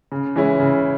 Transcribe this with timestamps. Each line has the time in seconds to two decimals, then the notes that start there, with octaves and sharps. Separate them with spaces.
0.12 C#3
0.36 E3 G#3 C#4 E4
0.59 C#3